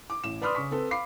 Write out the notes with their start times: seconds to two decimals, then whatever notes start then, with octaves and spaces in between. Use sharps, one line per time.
0.10 D6
0.24 A1 E7
0.42 B4 D5 B5 C6 D#6 F6
0.55 C#3 C#6 B6
0.71 C4 A4 B4
0.91 F5 B5 D6 C7